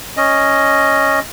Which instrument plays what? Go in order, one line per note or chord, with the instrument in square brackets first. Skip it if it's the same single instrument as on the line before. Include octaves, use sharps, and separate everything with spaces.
[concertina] C#4 D#5